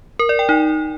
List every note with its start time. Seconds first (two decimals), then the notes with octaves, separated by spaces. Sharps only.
0.19 A#4
0.29 D5
0.39 G5
0.49 D#4